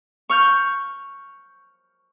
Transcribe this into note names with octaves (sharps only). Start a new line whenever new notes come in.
C#6 F6 G6